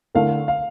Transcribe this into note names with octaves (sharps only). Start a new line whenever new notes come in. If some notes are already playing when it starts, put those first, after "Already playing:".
D3 A3 E4 A#4 F5
F5